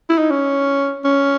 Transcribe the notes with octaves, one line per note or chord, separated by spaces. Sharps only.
E4
D#4
C#4
C#4